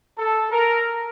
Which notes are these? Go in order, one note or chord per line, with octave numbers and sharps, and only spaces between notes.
A4
A#4